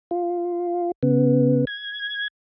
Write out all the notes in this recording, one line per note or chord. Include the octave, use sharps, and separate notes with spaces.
F4
C#3 B3
G#6